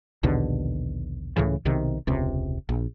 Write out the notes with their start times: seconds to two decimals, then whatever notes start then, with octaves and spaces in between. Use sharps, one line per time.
0.23 A#1 D#2 B2 D3
1.36 C#2 A2 C#3 E3
1.65 B1 C3 D#3
2.07 E1 C#2 C3
2.69 A#1